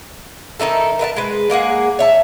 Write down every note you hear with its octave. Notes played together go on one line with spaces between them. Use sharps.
D#3 D#4 E4 A4
A#4 B4 E5 A5
G#3 B4
G#3 A#3 G#4 F#5
C#5 E5 A5